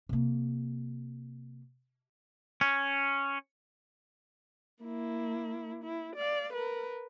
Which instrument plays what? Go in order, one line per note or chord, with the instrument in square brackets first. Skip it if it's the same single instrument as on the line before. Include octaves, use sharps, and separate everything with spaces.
[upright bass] C3 A#3
[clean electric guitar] C#4
[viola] A#3 E4
E4
D5 F5
A#4 B4